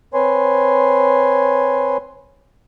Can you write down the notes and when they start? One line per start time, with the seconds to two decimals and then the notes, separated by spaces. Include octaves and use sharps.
0.14 C4 B4 C#5 G#5 C6